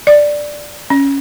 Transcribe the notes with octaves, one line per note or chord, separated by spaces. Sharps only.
D5
C#4